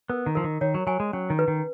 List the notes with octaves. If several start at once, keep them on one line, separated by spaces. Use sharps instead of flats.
B3 A#4
D#3
F3 A#4
D#3
D#3 C#5
F#3
F#3 G#5
G#3
F#3 C#4
D#3
B4
D#3